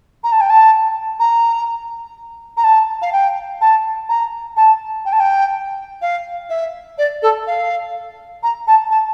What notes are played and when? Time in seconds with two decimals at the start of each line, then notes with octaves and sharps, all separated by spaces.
0.23 A#5
0.32 A5
0.40 G5
0.49 A5
1.19 A#5
2.57 A#5
2.63 A5
3.01 F5
3.12 G5
3.61 A5
4.09 A#5
4.56 A5
5.05 G5
5.12 A5
5.19 G5
6.01 F5
6.49 E5
6.98 D5
7.22 A4
7.46 F5
8.43 A#5
8.67 A5
8.90 A5